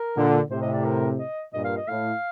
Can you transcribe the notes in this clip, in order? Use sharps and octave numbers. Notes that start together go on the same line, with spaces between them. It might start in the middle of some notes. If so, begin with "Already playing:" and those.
Already playing: A#4
A#2 D3
A2 C3 C5
D#5
D5
A#4
D#5
G2 A#2 D#5
F5
D#5
A2 F5